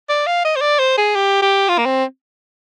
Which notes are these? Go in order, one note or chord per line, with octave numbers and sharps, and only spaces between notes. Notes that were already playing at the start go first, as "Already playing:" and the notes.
D5
F5
D#5
C5
D5
C5
G#4
G4
G4
F4
A#3
C4